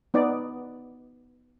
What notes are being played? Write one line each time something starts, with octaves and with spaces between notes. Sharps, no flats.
B3 D#4 D5